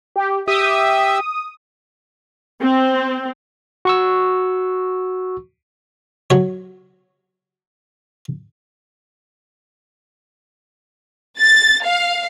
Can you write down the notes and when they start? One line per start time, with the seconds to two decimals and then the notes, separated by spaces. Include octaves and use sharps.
0.16 G4
0.48 G4 E5 D#6
2.61 C4
3.85 F#4 C#6 E6
6.30 F#3 C#5
11.39 A6
11.84 F5